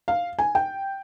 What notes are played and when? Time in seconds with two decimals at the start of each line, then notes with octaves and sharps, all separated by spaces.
0.08 F5
0.39 G#5
0.55 G5